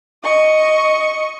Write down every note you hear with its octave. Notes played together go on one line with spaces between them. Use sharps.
D#5 C#6